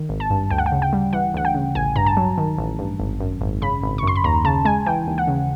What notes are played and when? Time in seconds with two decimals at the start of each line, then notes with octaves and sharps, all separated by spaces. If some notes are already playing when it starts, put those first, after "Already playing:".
Already playing: D#3
0.09 G#1
0.20 A5
0.30 G2
0.50 D2 G5
0.58 F#5
0.66 G5
0.72 C#3
0.82 G5
0.93 G3
1.13 E3 F#5
1.34 D2 F#5
1.45 G5
1.54 C#3
1.75 A1 G#5
1.96 G2 A#5
2.06 A5
2.17 F#3
2.38 D#3
2.58 A1
2.79 G2
3.00 G#1
3.20 F#2
3.41 G#1
3.62 C#3 B5
3.83 G#1
3.98 C#6
4.03 F#2 C6
4.16 B5
4.24 D#2 A#5
4.45 C#3 A5
4.65 G#3 G#5
4.86 E3 G5
5.07 D#2
5.18 F#5
5.27 C#3